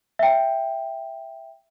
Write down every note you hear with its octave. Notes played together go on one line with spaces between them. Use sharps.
E5 G5